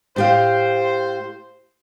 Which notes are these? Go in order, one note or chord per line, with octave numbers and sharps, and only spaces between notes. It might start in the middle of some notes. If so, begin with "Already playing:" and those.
A2 G4 C5 F5